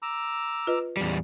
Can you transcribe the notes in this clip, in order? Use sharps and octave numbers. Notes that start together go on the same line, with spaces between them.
A#5 D6 E6
F4 B4 D#5
E2 G3